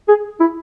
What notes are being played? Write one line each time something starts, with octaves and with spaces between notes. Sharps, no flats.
G#4
E4